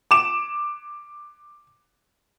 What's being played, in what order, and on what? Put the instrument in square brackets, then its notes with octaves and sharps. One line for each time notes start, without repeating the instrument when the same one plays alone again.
[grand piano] D6 E7